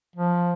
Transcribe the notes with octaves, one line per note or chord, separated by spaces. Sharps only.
F3